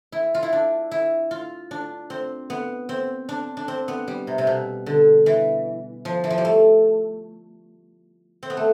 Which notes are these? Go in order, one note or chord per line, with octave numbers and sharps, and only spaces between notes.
E4
F4
E4
D4
E4
F4
D4
C4
B3
C4
D4
D4
C4
B3
G3
C3
C3
B2
D3
E3
F3
E3
F3
G3
A3
C4
B3
A3